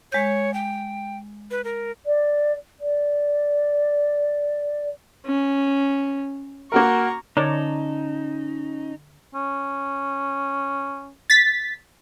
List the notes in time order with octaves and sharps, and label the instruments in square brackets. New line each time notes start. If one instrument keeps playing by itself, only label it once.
[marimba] G#3 G6 [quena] C#5
[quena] G5
B4
A#4
[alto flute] D5
D5
[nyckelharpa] C#4
[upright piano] A#3 F#4 A#4 [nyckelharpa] A#5 C#6
[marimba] D3 [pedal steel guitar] C#4 A5 A#5 [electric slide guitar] D#4 [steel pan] A#4 C#5 D5
[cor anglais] C#4
[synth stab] A6 B6